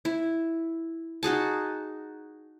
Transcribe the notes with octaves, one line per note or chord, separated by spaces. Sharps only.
E4
D#4 F#4 G#4 A5